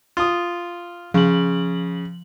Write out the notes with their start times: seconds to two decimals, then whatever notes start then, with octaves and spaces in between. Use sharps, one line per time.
0.17 F4 D#6
1.14 C#3 F3 F#7